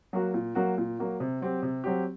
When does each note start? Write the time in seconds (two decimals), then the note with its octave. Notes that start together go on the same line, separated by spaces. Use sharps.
0.13 F#3 A#3 F#4
0.34 A#2
0.55 F#3 A#3 F#4
0.78 A#2
0.99 F#3 A#3 F#4
1.20 C3
1.42 F#3 C4 G4
1.63 C3
1.84 F#3 C4 G4